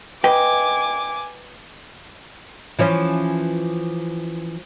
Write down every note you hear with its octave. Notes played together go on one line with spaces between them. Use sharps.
B4 D#5 G5 G#5 D6
E3 F3 C#4